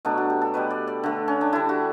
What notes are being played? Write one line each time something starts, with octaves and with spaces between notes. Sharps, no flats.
B2 F#3 A3 D4
F#4
G4
A4
B2 G3 B4
D5
D5
D3 A3
C#4
D4
D3 G3 E4
F#4